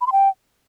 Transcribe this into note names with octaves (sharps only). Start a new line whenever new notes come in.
B5
C6
G5